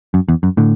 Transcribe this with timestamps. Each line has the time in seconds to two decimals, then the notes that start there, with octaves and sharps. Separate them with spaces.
0.14 F#2
0.28 E2
0.43 F#2
0.57 A2 D3